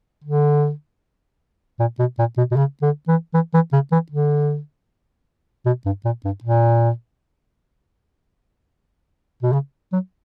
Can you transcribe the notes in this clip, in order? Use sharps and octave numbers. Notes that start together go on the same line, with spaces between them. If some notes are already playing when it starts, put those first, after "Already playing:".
D3
A#2
B2
A#2
B2
B2
C#3
D3
E3
E3
E3
C#3
E3
D3
B2
G2
A#2
G2
A#2
B2
C#3
F#3